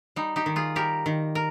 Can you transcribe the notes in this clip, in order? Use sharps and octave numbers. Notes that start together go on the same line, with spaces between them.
G3 D#4
D#4 G4
D#3
F4 G#4
G3 G4 A#4
D#3
A#4